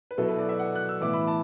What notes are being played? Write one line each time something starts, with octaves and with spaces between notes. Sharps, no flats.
B4
B2 F#3 B3 E4 A4
B4
D5
E5
F#5
F#6
E6
A2 E3 B3 E4 D6
B5
A5